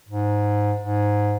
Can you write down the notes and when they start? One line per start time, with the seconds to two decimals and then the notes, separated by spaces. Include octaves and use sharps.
0.08 G#2
0.80 G#2